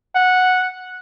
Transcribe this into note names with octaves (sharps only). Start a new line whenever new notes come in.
F#5